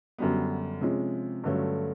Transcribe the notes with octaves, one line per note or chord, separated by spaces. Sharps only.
F#2 D3 G3 B3
C3 F3 G#3 C#4
G2 D3 F#3 A3 C#4